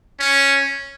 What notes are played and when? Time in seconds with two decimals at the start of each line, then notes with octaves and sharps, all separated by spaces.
0.20 C#4